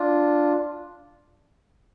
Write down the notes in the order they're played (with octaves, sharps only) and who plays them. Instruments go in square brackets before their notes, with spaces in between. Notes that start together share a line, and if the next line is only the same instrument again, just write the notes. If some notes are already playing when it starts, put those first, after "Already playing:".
Already playing: [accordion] D4 F4